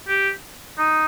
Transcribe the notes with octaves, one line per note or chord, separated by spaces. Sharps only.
G4
D#4